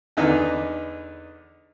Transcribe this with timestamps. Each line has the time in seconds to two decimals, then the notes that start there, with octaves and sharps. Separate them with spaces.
0.17 E2 D3 D#4 B4